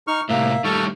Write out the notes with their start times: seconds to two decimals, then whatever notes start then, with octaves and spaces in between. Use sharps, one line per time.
0.07 D#4 C#6 F6
0.29 A2 C3 A#3 E5
0.64 D#3 G3 A3 A4 C#6 F6